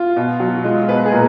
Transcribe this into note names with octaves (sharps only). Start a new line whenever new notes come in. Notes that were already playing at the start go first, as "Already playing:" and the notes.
Already playing: F4
B2
F#3
G#3 F4
B2 B4
G#4
A#2 A#4